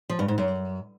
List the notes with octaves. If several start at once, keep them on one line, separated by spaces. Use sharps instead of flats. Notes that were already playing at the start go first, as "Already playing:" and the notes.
F3
G2
G#2
F#2